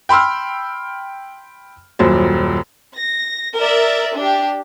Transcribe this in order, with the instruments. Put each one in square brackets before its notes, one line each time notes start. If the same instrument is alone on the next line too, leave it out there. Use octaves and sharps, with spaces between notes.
[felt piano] G5 B5 C6 E6 F6
D#1 F#2 A#2 F#3 C5
[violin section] A#6
A#4 D5 E5
D4 G4